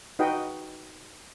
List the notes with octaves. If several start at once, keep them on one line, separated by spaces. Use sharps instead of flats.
D#4 F#4 B4 D#5 F#5 G5